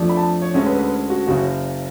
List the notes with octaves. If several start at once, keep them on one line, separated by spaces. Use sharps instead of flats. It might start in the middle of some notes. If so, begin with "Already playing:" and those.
Already playing: F2 F3 A3 D4
B5
A5
C#5
D2 D3 G#3 C#4 C#5
B4
B4
F#4
F#1 F#2 C#3 F#4